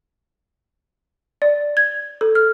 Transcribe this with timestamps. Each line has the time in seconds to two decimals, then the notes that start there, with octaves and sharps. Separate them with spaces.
1.42 D5
1.77 G#6
2.21 A4
2.35 F6